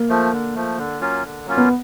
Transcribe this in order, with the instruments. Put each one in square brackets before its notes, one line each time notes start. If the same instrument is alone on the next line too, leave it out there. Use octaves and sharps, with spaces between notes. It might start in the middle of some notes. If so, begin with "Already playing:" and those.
Already playing: [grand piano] A#3
[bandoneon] F3 A3
D3
F3 A3
D3
F#3 A#3 C#4 F4
D3
F#3 A#3 C#4 F4
[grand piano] B3